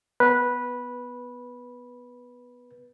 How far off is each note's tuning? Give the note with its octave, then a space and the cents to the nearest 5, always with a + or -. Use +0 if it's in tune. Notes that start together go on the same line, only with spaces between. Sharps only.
B3 +0 B4 -10